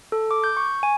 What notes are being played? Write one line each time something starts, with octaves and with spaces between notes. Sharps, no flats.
A4
D6
G6
C#6
G#5